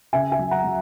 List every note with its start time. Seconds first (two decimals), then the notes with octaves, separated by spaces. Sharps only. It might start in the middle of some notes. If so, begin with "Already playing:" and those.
0.13 C#3 E5 G#5
0.32 E5 G#5
0.39 F#3
0.51 F#5 A#5
0.64 F#3